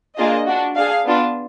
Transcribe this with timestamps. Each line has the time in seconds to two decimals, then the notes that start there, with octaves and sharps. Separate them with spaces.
0.17 A#3 D4 F4 G#4 D#5
0.46 D4 F#4
0.76 D4 G#4 F5
1.05 B3 D4 F4